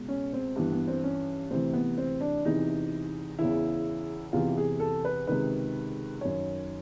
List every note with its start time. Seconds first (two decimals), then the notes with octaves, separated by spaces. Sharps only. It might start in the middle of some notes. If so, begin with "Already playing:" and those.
Already playing: C#2 B2
0.08 C#4
0.33 C4
0.56 G2 E3 B3
0.72 B3
0.88 C4
1.04 C#4
1.50 D2 C3 E3 C4
1.73 B3
1.98 C4
2.21 D4
2.45 E2 C3 E3 D#4
3.39 E2 C#3 E3 E4
4.33 E2 C3 E3 F4
4.57 G#4
4.80 A4
5.05 B4
5.27 C#2 C3 D#3 B4
6.21 F#2 D#3 C#5